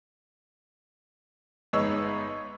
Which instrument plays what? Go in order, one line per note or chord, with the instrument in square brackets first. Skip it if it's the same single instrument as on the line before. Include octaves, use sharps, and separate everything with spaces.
[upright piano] G1 G#3 D#4 B4 C#5 E6